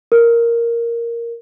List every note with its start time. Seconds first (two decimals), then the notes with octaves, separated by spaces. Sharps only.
0.12 A#4